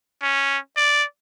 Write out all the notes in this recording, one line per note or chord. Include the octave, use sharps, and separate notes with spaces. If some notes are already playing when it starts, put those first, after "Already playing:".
C#4
D5